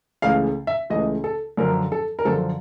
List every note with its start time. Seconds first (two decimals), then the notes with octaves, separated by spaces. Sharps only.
0.22 C#2 C#3 E3 A3 F5
0.67 E5
0.90 C#2 C#3 E3 A3 D#5
1.24 A4
1.57 F#2 D3 F3 A#4
1.92 A4
2.19 A#4
2.25 F#2 D3 F3 A4